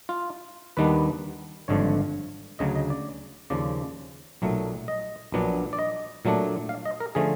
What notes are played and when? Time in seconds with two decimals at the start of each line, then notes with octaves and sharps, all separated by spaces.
0.09 F4
0.77 D#2 D#3 G3 B3 D4 B4
1.68 G#1 G2 D3 F3 C#5
2.59 D2 C#3 F#3 D#5
2.75 D#5
2.90 D5
3.50 D#2 C#3 F3 D5
4.42 B1 A#2 F#3 A3
4.88 D#5
5.32 A#1 A#2 F#3 B3 D4
5.73 D5
5.79 D#5
6.25 A#2 F#3 A3 D4
6.69 F5
6.85 D#5
7.00 A#4
7.15 D3 F3 A3 C#4 G#4